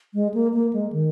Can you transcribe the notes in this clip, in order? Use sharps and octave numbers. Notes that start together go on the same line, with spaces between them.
G#3
A#3
A#3
G#3
D#3